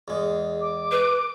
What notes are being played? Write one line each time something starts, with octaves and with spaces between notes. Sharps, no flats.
E2 G#3
D6
B4